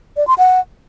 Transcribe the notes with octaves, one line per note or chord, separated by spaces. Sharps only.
D5
C6
F#5